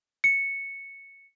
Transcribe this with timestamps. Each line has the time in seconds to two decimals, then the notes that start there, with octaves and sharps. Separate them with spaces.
0.24 C#7